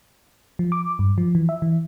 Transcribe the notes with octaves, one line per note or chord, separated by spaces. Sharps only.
F3
D6
G2
F3
E3
E5
E3